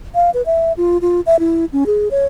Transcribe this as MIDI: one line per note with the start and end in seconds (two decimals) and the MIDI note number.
0.15 0.30 77
0.34 0.42 71
0.46 0.72 76
0.77 0.98 65
1.01 1.21 65
1.26 1.39 76
1.39 1.65 64
1.73 1.84 61
1.86 2.08 68
2.11 2.26 73